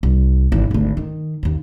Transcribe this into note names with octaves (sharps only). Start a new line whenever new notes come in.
C2
G#1 E3
G#1 D2
D#3
D#2 C#3